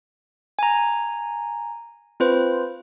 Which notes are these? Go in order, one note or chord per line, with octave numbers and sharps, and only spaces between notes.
G#5 A#5
C4 F4 B4 C5